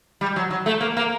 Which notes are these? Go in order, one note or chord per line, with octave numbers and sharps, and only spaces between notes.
G3
F#3
F#3
A3
A#3
A#3